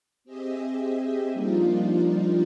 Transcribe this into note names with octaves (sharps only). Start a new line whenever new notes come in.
C4 G4 G#4 D#5 E5
F3 G3 A#3 D4 D#4 F4